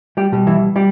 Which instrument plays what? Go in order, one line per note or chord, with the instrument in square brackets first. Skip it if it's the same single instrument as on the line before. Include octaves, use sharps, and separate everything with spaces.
[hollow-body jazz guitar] G3 G4
B2 G3
E3 E4
G3 G4